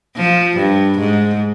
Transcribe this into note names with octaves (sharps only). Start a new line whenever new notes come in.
F3
G2
G#2